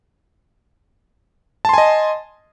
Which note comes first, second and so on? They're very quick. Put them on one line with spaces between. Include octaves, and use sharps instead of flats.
A5 C6 G#5 D#5